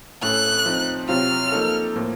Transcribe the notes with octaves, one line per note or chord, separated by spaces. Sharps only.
A2 A3 C#4 A4 F#6
F3 C4 D#4
C3 F#3 C4 F4 F6
F3 A#3 D#4 A4
A2 F3 A#3